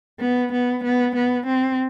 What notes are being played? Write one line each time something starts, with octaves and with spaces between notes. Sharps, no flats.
B3
B3
B3
B3
C4